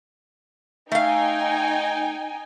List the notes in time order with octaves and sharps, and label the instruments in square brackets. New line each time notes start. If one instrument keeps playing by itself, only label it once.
[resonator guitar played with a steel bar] A3 F5 [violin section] D#4 G5 G#5